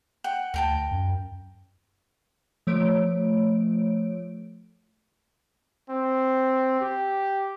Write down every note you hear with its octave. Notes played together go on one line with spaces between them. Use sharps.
F#5 G5
D2 A#4 G5 A5
F#2
F3 A3 C#5 D7
C4
G4